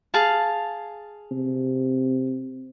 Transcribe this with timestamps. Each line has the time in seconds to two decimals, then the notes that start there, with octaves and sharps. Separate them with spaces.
0.14 G#4 F5 A5
1.31 C3